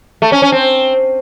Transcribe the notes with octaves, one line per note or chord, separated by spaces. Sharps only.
A3
C#4
C#4
C4